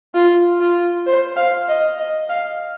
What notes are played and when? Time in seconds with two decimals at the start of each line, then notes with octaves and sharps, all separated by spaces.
0.14 F4
0.60 F4
1.07 C5
1.37 F5
1.69 D#5
1.98 D#5
2.30 F5